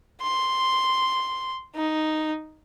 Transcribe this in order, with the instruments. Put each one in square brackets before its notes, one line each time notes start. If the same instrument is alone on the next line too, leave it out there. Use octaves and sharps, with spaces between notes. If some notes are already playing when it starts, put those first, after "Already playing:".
[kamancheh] C6
D#4